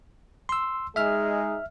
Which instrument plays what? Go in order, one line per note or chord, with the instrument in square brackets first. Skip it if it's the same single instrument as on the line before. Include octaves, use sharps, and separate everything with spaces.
[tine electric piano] C6 E6
[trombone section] G#3 D#4 G#4 [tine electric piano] E5 F6